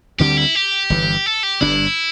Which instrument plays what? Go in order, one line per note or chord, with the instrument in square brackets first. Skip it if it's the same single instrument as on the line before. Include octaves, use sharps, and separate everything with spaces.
[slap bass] D2 D3 G3 C4 [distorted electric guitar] G4
[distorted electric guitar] E4
G4
[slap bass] G1 G2 E3
[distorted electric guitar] A4
G4
[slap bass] G1 G2 G3 D4 [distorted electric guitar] E4